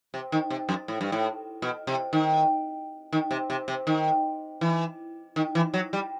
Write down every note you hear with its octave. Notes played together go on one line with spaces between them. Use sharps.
C3
D#3
C3
F#2
A2
G2
A2
B2
C3
D#3
D#3
C3
C3
C3
D#3
E3
D#3
E3
F#3
G3